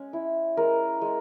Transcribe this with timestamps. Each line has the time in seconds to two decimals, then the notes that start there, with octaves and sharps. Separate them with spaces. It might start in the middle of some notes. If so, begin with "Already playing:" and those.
Already playing: G#3 C#4
0.13 E4
0.57 G#3 A#4
1.01 G#3